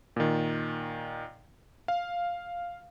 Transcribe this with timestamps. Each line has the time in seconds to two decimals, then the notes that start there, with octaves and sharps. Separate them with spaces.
0.16 A#2 D#3
1.88 F5